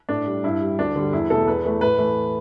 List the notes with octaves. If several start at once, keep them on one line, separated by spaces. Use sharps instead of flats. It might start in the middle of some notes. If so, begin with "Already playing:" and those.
A2 D4
G3
G2 E4
G3
D2 D4
D3 G3
E2 E4
B2 A3 A4
E2 B4
E3 A3
A2 B4
E3 A3